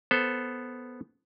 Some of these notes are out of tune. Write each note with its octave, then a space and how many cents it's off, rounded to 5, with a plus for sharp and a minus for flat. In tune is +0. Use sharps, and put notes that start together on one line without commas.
B3 +0 A4 +0 C5 +0